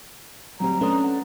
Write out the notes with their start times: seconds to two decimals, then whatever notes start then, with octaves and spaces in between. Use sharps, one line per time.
0.60 D2 F#3 G3 C4 G4 A#5
0.81 A3 C#4 D4 B4 C6 D#6
1.04 F#5